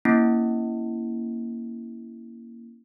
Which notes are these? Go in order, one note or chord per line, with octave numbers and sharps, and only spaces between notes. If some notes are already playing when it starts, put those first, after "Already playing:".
A#3 C#4 E4